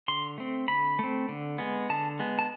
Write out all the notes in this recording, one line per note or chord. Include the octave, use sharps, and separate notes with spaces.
D3 C6
A3 C4
D3 B5
A3 C4
D3
G#3 B3
D3 A5
G#3 B3
A5